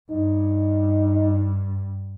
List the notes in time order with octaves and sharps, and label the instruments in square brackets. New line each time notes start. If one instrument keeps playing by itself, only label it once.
[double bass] G2 [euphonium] D#4